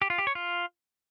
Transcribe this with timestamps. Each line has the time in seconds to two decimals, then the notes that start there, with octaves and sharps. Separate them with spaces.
0.02 G4
0.10 F4
0.18 G4
0.27 C#5
0.35 F4